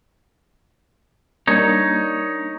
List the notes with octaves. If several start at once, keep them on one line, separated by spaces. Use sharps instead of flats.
G3 A#3 D4 D#4 C#5